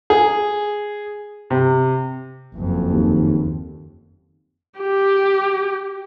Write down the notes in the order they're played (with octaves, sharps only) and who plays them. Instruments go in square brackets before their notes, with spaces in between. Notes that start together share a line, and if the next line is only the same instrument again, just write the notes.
[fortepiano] G#4
C3
[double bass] F#1 F2
[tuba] D#2
[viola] G4